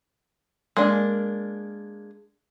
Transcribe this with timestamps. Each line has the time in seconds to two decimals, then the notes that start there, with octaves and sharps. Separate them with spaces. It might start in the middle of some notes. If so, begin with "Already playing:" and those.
0.77 G#3 A#3 D4